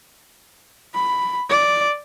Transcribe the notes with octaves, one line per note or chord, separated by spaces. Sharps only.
B5
D5